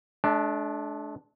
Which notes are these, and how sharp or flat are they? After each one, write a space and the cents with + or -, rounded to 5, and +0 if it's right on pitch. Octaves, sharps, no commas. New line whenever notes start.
A3 -45 D4 +0